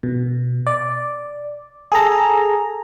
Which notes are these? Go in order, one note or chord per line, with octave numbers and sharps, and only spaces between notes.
B2
D5
G#4 A4 A#5